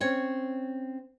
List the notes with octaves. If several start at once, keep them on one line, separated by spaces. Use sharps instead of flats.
C4 C#4 C#5